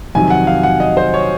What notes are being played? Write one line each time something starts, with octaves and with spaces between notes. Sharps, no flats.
F2 C3 D#3 F#3 G#5
F#5
F5
F#5
D#5
C5
C#5